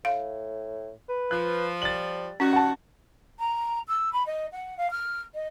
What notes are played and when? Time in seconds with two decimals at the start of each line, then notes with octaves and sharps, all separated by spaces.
0.05 A2 F5
1.09 B4
1.31 F3 F#6
1.82 G3 A6 F#7
2.40 D#3 G3 C#4 F#4
2.53 F#5 A5
3.39 A#5
3.87 E6
4.12 B5
4.26 D#5
4.52 F#5
4.77 F5
4.91 F6
5.34 D#5